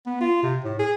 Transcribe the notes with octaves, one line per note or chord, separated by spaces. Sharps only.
B3
F4
C3
A2
G#4